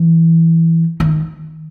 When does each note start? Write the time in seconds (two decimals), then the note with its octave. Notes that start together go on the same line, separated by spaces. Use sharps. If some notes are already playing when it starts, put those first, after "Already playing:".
Already playing: E3
1.00 D#3